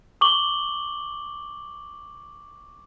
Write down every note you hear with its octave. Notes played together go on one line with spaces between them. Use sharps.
C#6 D6 F#7 G7